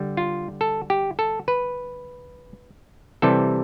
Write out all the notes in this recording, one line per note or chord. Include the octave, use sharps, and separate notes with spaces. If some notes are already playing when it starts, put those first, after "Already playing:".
Already playing: D3 G3
F4
A4
G4
A4
B4
C3 E3 G3 A4